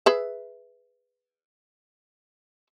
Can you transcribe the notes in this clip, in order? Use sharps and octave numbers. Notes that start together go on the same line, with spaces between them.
G#4 B4 E5